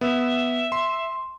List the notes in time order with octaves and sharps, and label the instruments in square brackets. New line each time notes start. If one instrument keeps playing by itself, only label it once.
[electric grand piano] B3 [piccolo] E5
[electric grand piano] C6